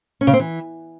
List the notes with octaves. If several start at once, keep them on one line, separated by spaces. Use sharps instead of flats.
C#4
C#3
C4
E3